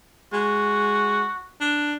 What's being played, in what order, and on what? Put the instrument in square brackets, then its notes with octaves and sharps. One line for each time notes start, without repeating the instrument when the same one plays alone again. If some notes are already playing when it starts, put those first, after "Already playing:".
[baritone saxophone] G#3 [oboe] F#4
[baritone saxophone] D4